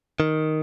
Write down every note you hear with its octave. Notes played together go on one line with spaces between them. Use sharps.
D#3